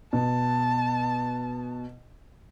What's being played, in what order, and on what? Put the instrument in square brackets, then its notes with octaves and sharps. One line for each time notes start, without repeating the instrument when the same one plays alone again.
[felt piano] B2 [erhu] A5